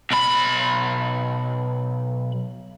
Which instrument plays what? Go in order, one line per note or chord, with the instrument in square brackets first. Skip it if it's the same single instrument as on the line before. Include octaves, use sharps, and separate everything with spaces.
[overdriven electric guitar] B1 B5